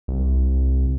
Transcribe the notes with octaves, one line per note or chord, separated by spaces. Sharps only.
C2